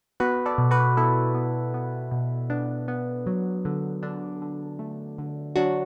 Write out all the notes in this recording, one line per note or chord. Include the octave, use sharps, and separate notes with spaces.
B3 F#4 B4
A4 D5
B2
F#4 B4
B3 E4 A4
B3
B3
B2
B3 D4
B3
F#3
D3
D3 D4
D3
A3
D3
F#3 D4 F#4